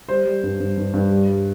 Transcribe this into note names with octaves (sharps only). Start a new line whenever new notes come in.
G3 C5
G3
G2
G2
G2
G2
G3
G3